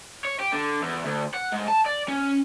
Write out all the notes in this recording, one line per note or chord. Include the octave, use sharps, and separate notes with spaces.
C#5
G4
D3
E2
D2
F#5
G#2
A5
D5
C#4